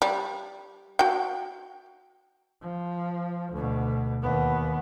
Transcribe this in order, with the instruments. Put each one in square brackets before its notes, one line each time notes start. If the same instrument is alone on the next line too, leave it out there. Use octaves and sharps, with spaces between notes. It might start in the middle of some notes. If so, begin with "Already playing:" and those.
[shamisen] G3
F#4 G5
[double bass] F3
D2 B2
D#2 B3